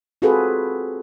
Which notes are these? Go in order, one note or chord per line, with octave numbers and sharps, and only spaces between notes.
C4 F4 F#4 G#4 A4 B4